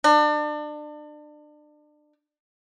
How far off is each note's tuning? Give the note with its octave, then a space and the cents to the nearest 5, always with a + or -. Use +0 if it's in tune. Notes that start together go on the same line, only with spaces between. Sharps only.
D4 +30